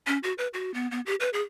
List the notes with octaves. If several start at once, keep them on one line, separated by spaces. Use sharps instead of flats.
C#4
F#4
B4
F#4
B3
B3
G4
B4
G#4